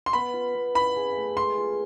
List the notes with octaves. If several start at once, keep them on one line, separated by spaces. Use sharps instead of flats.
C6
B3 B5
F4
B3
E4 B5
G#4
A3
G#3 C6
F4